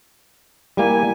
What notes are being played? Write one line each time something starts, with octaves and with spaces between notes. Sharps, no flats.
G3 A#3 E4 G#5